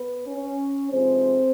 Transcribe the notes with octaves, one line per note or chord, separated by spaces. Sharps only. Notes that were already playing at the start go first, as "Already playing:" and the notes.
Already playing: B3 B4
C#4 C#5
C3 F3 G#3 B3 C4 D#4 C5